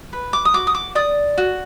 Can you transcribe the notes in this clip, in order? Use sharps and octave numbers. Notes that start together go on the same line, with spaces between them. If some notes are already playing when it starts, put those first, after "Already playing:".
B4
D6
D#6
F#4 D6
D#6
D6
D5 D#6
F#4